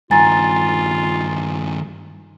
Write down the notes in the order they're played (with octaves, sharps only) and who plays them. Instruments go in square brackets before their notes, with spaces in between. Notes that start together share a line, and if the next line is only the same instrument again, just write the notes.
[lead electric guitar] G2 D#3 [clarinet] F4 [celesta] G#5 A#5 A6